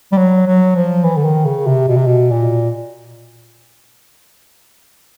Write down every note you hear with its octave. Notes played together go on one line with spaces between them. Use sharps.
G3
F#3
F#3
F3
E3
D3
D#3
C#3
C3
B2
C3
B2
A#2